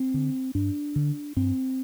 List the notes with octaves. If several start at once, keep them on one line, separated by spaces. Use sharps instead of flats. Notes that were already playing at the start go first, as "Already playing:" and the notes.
Already playing: C4
D3
G2 D4
D3
G2 C4